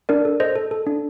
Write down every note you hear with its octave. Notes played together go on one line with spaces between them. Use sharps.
D4 A#4 D5
A4
A4 C5 D#5
A4
A4
D4